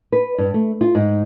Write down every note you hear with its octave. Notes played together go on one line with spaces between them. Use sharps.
B4
G2
A3
F4
G#2